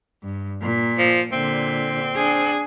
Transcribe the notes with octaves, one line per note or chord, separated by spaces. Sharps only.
G2
A#2
F3
A#2 D3 C4
D4 G#4